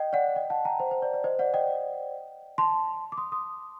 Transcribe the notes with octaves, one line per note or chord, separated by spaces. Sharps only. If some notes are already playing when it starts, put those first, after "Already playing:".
Already playing: D#5 G5
D5 F#5
D#5 G5
F#5 A5
G5 A#5
C5
C5
D5
D5
C5 D#5
D5 F#5
D#5 G5
A5 C6
D6
C6 D#6
C6 D#6